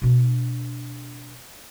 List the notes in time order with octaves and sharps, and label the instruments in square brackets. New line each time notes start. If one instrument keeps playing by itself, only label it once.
[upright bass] B2 D4